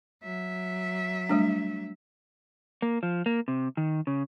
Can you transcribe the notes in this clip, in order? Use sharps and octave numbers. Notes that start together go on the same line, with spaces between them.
F#3 E5
G3 A3 D4
A#3
F3
A#3
C3
D#3
C#3